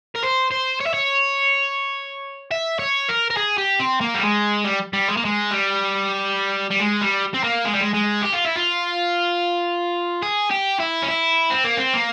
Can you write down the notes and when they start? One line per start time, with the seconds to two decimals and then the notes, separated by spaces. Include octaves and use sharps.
0.15 A#4
0.23 C5
0.51 C5
0.80 C#5
0.86 E5
0.94 C#5
2.51 E5
2.79 C#5
3.09 A#4
3.30 A#4
3.37 G#4
3.58 G4
3.80 C4
4.01 A#3
4.15 G3
4.23 G#3
4.65 G3
4.93 G3
5.08 G#3
5.17 A#3
5.25 G#3
5.51 G3
6.70 G3
6.80 G#3
7.01 G3
7.34 C4
7.44 A#3
7.65 G#3
7.74 G3
7.81 G#3
7.94 G#3
8.22 G4
8.33 F4
8.45 E4
8.56 F4
10.22 G#4
10.50 G4
10.79 E4
11.02 C#4
11.08 E4
11.50 C4
11.64 A#3
11.77 C4
11.93 A#3